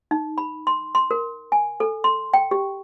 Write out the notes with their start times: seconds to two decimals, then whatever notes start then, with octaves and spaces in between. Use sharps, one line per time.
0.11 D#4
0.38 B5
0.67 C6
0.95 C6
1.11 A#4
1.52 G#5
1.80 A4
2.04 C6
2.34 G5
2.51 G4